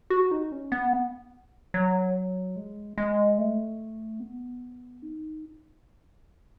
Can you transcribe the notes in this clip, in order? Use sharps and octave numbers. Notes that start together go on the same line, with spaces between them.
F#4
D#4
C#4
B3
F#3
G#3
G#3
A3
B3
D#4